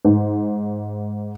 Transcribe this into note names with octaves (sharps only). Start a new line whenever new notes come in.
G#2